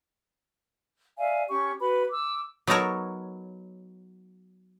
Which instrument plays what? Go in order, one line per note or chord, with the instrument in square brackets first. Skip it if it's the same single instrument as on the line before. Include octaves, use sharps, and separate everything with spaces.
[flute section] D5 E5 F5 G#5
C#4 G4 C#6
F#4 B4 B5
D6 E6
[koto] F#3 B3 D#4 A4 A#4 C#5